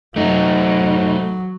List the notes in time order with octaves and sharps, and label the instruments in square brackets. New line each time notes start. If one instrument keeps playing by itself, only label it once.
[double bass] F#3 [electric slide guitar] A3 D#4